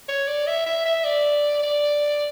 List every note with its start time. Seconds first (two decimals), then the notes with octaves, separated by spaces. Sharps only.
0.08 C#5
0.28 D5
0.47 E5
0.66 E5
0.86 E5
1.05 D5
1.63 D5